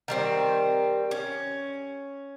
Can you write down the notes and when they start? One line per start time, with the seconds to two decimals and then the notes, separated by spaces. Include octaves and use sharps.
0.08 D#3 G3 C4
1.11 C#4